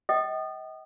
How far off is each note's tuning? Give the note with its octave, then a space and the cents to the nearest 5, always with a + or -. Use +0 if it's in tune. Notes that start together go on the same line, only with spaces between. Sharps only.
D#5 +35 G5 -40 D#6 -30